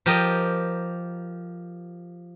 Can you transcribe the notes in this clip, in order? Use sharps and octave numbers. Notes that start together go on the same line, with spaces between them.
F3 G4 A#4 D#5